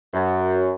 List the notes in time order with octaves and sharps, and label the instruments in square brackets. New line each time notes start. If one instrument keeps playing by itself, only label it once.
[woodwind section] F#2